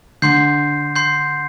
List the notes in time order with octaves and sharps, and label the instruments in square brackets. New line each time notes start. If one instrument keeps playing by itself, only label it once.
[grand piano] D3 [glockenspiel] C6 G6 C7
[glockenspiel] C6 G6 C7